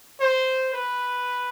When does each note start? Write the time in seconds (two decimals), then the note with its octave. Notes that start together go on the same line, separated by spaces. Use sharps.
0.20 C5
0.74 B4